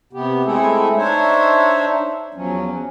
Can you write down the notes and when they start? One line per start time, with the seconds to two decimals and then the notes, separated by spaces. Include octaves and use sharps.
0.13 C3 B3 G4
0.45 G#3 A3 C4 E4 G#4 A4
0.97 D4 D#4 C5 C#5 E5
2.34 E2 F3 F#3 C#4